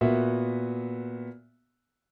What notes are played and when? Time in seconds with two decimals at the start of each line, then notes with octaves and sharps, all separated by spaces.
0.01 A#2 B3 F#4 E5